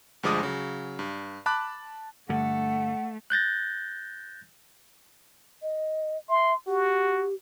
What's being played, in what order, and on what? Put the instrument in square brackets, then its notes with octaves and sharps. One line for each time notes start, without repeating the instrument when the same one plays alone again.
[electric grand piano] D2 G2 F3 G#3 D6 D#6
C#3 F#3
G2
A5 B5 D6 F#6
[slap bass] G2 D3 [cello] A3 [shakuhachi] F#5
[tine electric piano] F#6 G6 A6 A#6
[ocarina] D#5
[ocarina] E5 [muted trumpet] C6
[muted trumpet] F#4 [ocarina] G4